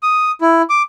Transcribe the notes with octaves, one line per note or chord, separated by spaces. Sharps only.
D#6
E4
D6